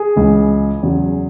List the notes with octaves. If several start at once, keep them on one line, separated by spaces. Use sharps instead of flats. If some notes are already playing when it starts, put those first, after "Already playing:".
Already playing: G#4
C#2 C#3 E3
E2 C#3 F#3